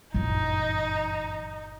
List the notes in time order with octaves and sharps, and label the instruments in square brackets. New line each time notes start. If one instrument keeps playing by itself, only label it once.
[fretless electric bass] G1 A#2 G3 [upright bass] F#2 E3 [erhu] D#4